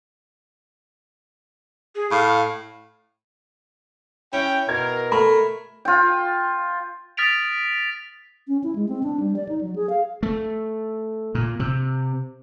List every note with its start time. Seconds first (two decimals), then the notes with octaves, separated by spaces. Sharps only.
1.95 G#4
2.11 A2 F5
4.33 C#4 E4 G5
4.69 B2 A#4 G#6
5.12 A3 A#4 B5
5.85 F4 G5
7.17 D#6 F6 A6 B6 D7 F7
8.48 C#4
8.64 E4
8.75 G#3
8.89 C4
9.03 D4
9.20 G3
9.36 D5
9.49 D#4
9.61 F#3
9.76 G#4
9.89 F5
10.23 A3
11.35 A#2
11.60 C3